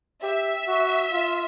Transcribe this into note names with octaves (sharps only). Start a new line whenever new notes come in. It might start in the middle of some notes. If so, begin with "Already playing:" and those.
G4 E5
F#4
F4